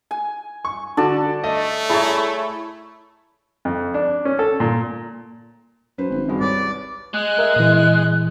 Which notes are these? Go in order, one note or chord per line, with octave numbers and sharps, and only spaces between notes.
G#5
C#6
D3 F#4 A4 D5 A5
A3 D#5
E4 G#4 C#5 A5 A#5
F2
D4
C#4
A4
A#2
F#2 B4 C5
G#1
G2 G#3 F#4
C2 B4 C#5 D5
G#3 F#6
A#4 E5
A#2 E3